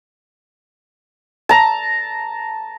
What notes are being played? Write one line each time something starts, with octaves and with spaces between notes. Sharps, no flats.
A5 A#5